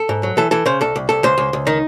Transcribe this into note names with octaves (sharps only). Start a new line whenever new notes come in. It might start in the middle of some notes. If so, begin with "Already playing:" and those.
Already playing: A4
G#2
F#3
E3 A4
E3 A4
C#3 C5
C2 A4
C2
C2 A4
C#2 C5
C#2
C#2
D#3 D#4